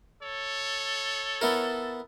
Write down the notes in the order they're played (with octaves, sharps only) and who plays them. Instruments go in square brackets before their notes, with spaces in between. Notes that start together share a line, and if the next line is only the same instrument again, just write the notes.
[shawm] A4 [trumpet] C#5
[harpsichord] B3 E4 A#4